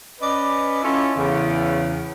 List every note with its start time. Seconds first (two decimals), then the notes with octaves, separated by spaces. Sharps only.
0.21 C#4 B4 D5 D#5
0.83 C#4 E4 F4 A4 C#5
1.16 E2 C#3